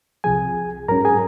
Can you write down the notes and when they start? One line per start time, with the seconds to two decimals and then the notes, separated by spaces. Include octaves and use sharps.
0.24 C2 C3 F3 G#4 G#5
0.88 G#2 F#3 C#4 A#4 A#5
1.05 G#4 G#5